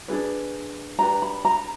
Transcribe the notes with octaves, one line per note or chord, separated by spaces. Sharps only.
D4 F4 G#4 B4
D4 G4 B4 A#5
B5
A#5